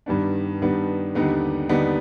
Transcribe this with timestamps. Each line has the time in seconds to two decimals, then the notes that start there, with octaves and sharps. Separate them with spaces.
0.06 G2 D#3 G3 B3 D4
0.61 G2 D#3 G3 B3 D4
1.15 D#2 D3 G3 B3 D#4
1.69 D#2 D3 G3 B3 D#4